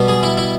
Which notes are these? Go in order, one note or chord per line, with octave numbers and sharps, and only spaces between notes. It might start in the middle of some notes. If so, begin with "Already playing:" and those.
Already playing: B2 G3 B3
G#4
E4
E4